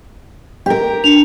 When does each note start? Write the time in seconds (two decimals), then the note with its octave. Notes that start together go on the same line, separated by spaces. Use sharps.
0.66 G4 A#4
1.04 D4 F7